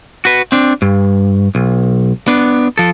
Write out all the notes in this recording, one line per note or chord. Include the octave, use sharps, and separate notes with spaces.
F#4 B4
C4 D4
G2
B1
B3 D4
F3 A4